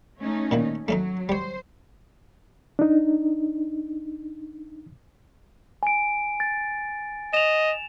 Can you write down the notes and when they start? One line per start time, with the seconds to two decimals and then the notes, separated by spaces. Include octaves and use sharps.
0.19 A3 C#4 D#4
0.51 A#2 D#3 E3
0.88 F#3 A3 C#4 D#4
1.29 G3 C5 C#5
2.79 D4 D#4
5.83 G#5 D7
6.40 A6
7.33 D#5 E7 F7